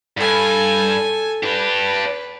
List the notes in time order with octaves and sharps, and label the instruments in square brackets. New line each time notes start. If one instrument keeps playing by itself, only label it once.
[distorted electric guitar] G2 [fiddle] A4 G#5
[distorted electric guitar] D4 G4 [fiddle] B4